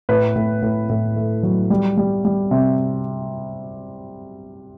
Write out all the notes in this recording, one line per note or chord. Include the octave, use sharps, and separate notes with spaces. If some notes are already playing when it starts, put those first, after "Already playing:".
A2 B4
A2
A2
A2
A3
F#3
G3
G3
G3
C3